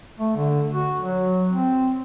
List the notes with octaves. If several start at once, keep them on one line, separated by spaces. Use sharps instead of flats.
A3
D3
F#4
F#3
C4